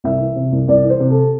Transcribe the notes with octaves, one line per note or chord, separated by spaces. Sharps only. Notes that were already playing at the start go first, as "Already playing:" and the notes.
C2 E5
E3
C3
C2
C2 D5
E3
C5
C3
A4